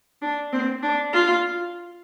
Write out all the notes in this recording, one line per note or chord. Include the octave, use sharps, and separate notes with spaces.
D4
C4
D4
F4